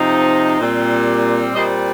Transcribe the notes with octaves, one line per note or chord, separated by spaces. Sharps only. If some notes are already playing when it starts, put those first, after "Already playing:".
Already playing: C3 F3 C4 D#4
A#2 G3 C4
A#2 G3 C4 C5 D#5